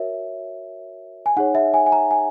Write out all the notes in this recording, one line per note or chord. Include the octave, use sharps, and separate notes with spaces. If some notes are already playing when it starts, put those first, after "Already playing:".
Already playing: F#4 A#4 C#5 E5
G#5
D#4 G#4 C#5 F#5
E5
G#5
G#5
A#5
G#5